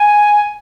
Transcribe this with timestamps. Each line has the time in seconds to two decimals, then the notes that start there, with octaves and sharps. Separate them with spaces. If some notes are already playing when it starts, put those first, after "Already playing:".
Already playing: G#5